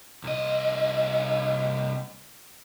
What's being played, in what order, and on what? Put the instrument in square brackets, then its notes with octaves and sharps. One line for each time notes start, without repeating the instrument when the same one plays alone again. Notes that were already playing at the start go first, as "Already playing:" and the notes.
[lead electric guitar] C2 D#5